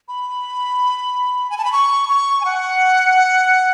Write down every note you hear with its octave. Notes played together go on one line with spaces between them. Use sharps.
B5
G#5
A5
B5
C#6
C#6
G#5
F#5